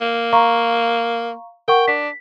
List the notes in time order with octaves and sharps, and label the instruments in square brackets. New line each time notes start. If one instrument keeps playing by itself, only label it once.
[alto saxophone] A#3
[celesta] F5 A#5 C#6
[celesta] A#4 F#5 C#6 [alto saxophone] G5
[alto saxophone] D4 [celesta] B6